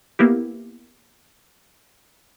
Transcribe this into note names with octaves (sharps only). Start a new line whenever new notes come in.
A#3 B3 E4 G4